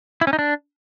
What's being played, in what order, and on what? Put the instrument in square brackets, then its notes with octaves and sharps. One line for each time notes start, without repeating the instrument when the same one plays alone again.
[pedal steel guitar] E4
C#4
D#4
D4